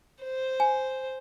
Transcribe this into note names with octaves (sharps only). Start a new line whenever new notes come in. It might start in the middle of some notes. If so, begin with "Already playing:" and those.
C5
G#5